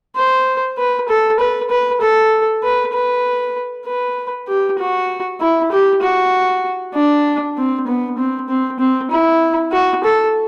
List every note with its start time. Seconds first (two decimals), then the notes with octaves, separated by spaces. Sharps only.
0.16 C5
0.78 B4
1.09 A4
1.40 B4
1.70 B4
2.01 A4
2.63 B4
2.93 B4
3.86 B4
4.48 G4
4.78 F#4
5.41 E4
5.72 G4
6.02 F#4
6.94 D4
7.57 C4
7.87 B3
8.18 C4
8.49 C4
8.79 C4
9.11 E4
9.72 F#4
10.04 A4